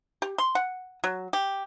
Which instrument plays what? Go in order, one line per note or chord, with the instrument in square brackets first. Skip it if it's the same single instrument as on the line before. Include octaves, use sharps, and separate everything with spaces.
[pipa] G4
C6
F#5
F#3
G4